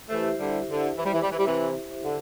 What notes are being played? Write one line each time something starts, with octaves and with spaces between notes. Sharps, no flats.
E3 A3 E4 G4 C5 E5
D3 G3
D3
E3
G3
E3
G3
E3
G3
C3 E3
D3